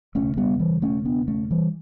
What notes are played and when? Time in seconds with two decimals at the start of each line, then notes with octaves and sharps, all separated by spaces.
0.15 E1 D2 C#3 A3 C#4
0.37 G3 B3
0.60 E3 G3
0.82 A3 C#4
1.05 B3 D4
1.28 A3 C#4
1.51 E3 G3